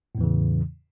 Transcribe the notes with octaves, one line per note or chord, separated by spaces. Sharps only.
E2 A2 C#3 E3